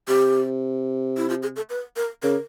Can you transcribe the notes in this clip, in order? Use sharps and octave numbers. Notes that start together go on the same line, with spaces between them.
C3 G4
E4
F4
G#4
A4
B4
A#4
C#3 A#4